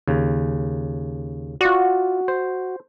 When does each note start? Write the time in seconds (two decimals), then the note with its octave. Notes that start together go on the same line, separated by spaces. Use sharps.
0.08 D#2 C#3
1.61 F4 F#4 D5
2.28 C5